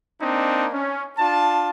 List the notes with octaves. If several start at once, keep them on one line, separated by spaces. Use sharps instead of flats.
A#3 C4 D4 D#4
C#4
D4 F4 A5